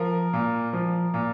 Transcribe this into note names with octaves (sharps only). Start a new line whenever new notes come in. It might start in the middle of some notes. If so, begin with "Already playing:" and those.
Already playing: F3 A#4
A#2
F3
A#2